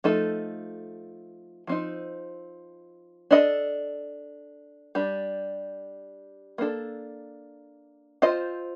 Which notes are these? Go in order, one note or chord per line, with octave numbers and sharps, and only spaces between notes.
F3 A3 D#4 A4
F3 C4 D#4
D4 A4 D#5
G3 D4 G4
A#3 D4 A4
C4 F4 C5 D#5